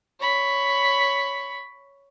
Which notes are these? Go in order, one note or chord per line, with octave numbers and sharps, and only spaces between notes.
C#5 B5